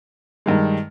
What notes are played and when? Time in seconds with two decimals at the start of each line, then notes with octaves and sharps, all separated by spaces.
0.46 G2 D#3 G#3